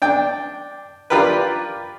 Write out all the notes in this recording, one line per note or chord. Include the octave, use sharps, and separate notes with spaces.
D4 G5
D4 F4 G4 A#4 B4